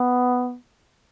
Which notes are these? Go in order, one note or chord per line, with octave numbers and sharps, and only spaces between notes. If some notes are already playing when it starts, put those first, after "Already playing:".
Already playing: B3